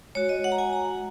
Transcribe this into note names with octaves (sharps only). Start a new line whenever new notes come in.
G#3 F#4 C#5
D#5
F#5
A#5
G#5
A#5